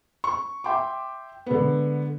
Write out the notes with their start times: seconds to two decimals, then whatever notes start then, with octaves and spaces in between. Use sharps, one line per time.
0.24 C#6
0.64 E5 G5 C6 D6
1.46 D3 G#3 B3